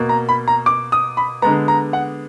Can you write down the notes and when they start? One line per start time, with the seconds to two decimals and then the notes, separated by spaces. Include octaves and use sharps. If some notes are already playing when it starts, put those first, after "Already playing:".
Already playing: B2 A#3
0.09 A#5
0.29 B5
0.48 A#5
0.66 D6
0.92 D#6
1.17 B5
1.42 D3 G#3 B3 A#5
1.68 A#5
1.93 F#5